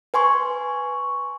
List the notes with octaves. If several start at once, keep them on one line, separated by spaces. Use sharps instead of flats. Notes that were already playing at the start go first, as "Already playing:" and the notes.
B4 G#5 C6 C#6